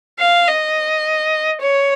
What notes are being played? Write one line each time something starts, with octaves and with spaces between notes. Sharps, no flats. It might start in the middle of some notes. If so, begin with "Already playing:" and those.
F5
D#5
C#5